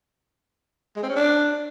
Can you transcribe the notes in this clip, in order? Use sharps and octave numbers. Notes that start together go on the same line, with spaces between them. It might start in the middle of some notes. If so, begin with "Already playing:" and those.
G#3
C4
C#4
D4